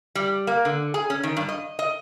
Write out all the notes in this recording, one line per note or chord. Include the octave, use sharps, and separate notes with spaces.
G3
A#3
D3
G#4
C#4
D#3
G2
D#5
D#5